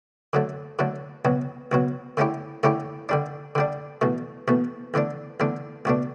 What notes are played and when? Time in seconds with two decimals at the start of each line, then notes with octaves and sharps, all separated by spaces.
0.33 D3 F#3 A3
0.79 D3 F#3 A3
1.25 C#2 B2 F#3
1.72 C#2 B2 F#3
2.17 D3 A3 C#4 E4 G4
2.63 D3 A3 C#4 E4 G4
3.09 D3 G3 D4
3.55 D3 G3 D4
4.01 E2 B2 A3
4.48 E2 B2 A3
4.94 E2 D3 A3 D4
5.40 E2 D3 A3 D4
5.85 C#2 B2 A3 D4